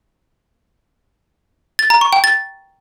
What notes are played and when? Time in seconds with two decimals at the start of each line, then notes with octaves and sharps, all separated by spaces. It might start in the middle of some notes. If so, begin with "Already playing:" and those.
1.79 A6
1.90 A#5
2.01 C#6
2.13 G5
2.24 A6